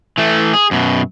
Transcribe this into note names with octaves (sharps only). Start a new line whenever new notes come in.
E3 A3
G#4
F#2 B2